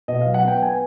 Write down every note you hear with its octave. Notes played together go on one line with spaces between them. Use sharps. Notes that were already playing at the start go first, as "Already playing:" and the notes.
B2 D#5
F#3 F5
F#5
B3 G5
B3 G#5